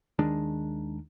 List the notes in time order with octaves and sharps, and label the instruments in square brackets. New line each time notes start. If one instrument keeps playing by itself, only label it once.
[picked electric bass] D#2 D#3 G#3 D4